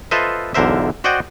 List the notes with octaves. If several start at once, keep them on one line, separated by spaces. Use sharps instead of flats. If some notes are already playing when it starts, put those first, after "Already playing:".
F4 A4 B4 C5 D#5 E5
B1 E2 D3 A#4 C5 E5
F#4 C5 D5 D#5 F#5 G5